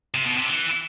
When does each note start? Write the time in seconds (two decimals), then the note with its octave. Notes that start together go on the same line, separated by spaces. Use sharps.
0.14 C3
0.26 B2
0.37 C3
0.48 E3